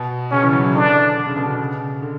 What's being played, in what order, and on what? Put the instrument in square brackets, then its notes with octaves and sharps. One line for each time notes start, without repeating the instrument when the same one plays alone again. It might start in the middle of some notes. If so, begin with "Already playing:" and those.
Already playing: [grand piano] B2
[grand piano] C#3 [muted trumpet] C#4
[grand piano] E3
F#3
E3
[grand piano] D3 [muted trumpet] D4
[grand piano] D3
C#3
B2
C#3
D3